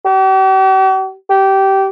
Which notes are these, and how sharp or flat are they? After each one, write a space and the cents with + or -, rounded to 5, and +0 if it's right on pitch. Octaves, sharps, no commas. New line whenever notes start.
G4 -45
G4 -20